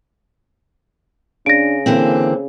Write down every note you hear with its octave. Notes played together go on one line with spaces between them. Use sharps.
C#3 D4 A#6 D7
D3 E3 A#3 C4